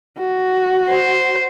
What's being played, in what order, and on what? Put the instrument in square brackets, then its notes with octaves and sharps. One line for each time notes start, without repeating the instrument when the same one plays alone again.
[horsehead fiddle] F#4
[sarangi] C5